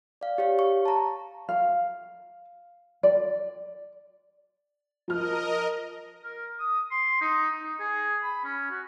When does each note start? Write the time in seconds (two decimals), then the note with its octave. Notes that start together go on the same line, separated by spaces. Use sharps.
0.21 D5 F5
0.38 G4 C#5 F5
0.59 C#6
0.85 A5 A#5
1.49 F5
3.03 D5
5.08 F3 A#4 D#5 F6
6.23 A#4
6.59 D#6
6.91 C6
7.21 D#4
7.62 D#4
7.80 G#4
8.23 B5
8.44 C#4
8.70 F#4